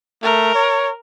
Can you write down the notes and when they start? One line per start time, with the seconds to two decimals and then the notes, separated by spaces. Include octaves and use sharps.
0.23 A3 A#4
0.55 C#5